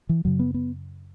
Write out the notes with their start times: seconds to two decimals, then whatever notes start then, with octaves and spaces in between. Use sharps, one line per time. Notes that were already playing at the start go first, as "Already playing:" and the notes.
0.09 E3
0.25 F#2 C#3 F#3
0.39 B3
0.54 B3